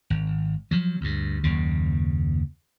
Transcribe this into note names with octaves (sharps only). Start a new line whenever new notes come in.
G#1
F3 F#3
D2 G2
F#1 D#2 C#3